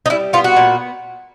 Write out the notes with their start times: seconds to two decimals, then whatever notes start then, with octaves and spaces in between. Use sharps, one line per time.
0.06 D#4
0.10 G3 E4
0.33 B3 F4
0.44 F#4
0.56 A#2